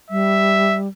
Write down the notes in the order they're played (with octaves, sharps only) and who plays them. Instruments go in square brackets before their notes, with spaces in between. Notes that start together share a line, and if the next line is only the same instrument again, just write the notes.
[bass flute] G3 [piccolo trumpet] E5